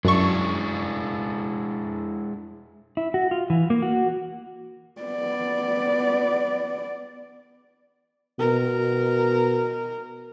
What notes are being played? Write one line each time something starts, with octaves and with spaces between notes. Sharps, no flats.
F#2 G#3 D4 E4 C#6
E4
F#4
F4
E3
A#3
F#4
B3 D5
B2 A#4